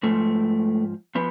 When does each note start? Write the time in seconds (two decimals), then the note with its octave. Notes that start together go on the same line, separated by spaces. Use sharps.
0.03 G#2 F3 A3
1.15 F3 B3